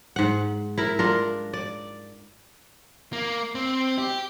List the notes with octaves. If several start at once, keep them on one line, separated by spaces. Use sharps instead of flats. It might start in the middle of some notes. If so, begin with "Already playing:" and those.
G#2 F#5
E4 A#4
D4 F4 A#4
D5
A#3
C4
G4